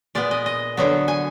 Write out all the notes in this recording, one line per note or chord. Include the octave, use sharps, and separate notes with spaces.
A#2 G#3 B3 D5
D#5
D#5
D3 F#3 B3
G#5